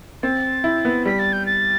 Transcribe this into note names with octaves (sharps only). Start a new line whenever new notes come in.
C4 A6
E4
B3
G3 B6
A6
G6
A6